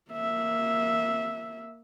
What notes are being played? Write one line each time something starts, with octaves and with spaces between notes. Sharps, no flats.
A#3 E5